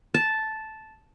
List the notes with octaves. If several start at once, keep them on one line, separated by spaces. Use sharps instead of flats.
A5